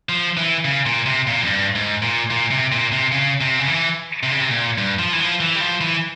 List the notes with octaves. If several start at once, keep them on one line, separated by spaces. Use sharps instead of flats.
F3
E3
C#3
A#2
C3
A#2
F2
G2
G#2
A#2
A#2
C3
A#2
C3
C#3
C3
C#3
E3
C3
C#3
C3
A#2
G2
F3
E3
F3
E3
G3
F3
E3